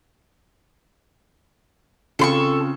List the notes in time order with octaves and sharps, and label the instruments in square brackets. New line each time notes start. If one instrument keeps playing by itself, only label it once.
[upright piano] C#3 C4 F4 [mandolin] A4 C6 C#6